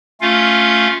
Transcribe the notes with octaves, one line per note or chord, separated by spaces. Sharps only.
A3 C#4 F4 F5